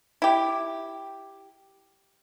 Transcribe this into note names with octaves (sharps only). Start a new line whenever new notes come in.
E4 G4